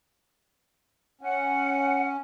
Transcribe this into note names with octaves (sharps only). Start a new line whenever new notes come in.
C#4 F#5